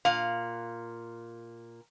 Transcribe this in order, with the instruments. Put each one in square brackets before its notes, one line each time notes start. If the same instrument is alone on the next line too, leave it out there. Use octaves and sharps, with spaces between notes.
[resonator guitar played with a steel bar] A#2 F5